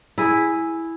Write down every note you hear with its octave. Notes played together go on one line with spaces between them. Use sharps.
E4 G#4